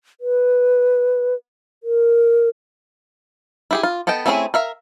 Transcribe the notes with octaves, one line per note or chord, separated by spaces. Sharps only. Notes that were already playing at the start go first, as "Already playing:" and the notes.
B4
A#4
E4 G4 G#4
F4
B3 A4 D#5 G5 A5
A3 C4 C#4 E4 G#4
A#4 E5 F5